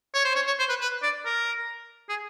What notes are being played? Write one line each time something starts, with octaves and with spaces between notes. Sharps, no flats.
C#5
C5
C#5
C#5
C5
B4
B4
D5
A#4
G#4